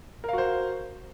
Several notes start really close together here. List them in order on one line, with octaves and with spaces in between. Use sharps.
A#4 F5 F#4 C5